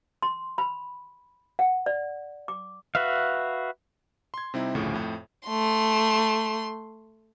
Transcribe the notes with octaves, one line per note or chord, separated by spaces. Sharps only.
C6
B5
F#5
D5
D6
F#4 B4 E5 F5
C6 G#6
C3 G3 C4 D#4 E4
G1 D2 A2 C#3 F3
F2 A2
A3 C6